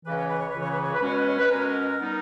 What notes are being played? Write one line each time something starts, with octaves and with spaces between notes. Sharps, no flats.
C#2 C#3 E3 B4
C#5
B4
C#5
C#2 C#3 E3 B4
C#5
B4
C#5
B4
B2 G#3 C#4 C#5
B4
C#5
B4
B2 G#3 C#4 A#4
G3 B3 D#4